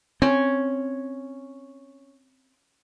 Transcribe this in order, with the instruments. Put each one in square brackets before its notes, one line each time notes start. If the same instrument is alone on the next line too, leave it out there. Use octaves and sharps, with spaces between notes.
[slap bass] C4 [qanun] C#4